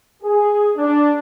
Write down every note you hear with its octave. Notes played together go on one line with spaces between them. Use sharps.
G#4
D4